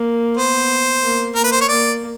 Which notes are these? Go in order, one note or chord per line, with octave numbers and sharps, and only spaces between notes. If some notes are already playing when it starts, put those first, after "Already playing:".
Already playing: A#3
B3 C5
A#3
A#3 A#4
B4
C5
C#5
A#3 D5